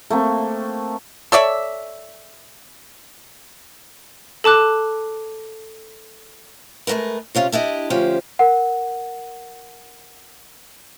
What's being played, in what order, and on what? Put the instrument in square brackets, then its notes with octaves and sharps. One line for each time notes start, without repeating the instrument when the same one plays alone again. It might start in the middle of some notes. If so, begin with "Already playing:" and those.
[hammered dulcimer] A3 A#3 C4
[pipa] A4 C#5 D5 E5
[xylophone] A4 A5 D6 F#6
[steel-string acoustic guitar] G#3 A3 B3 A#4 B4
C3 C#4 F4 G4
D4 E4 G4 D#5
D2 F3 C#4 G4 C5
[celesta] A#4 F#5